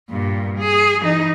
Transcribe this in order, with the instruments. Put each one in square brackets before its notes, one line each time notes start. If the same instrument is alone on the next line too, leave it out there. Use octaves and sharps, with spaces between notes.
[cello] G2 A#2
G#4
E3 D#4